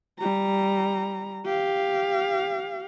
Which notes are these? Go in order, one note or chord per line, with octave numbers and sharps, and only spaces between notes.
G3 A#5
G4 F5